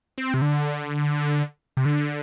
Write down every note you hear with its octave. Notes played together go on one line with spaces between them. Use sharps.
C4
C3
D3
C3
D3